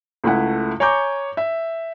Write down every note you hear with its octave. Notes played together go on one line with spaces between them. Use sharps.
C#2 A3 E4 F#5
C#5 G#5 A#5 C#6 D6 G6
E5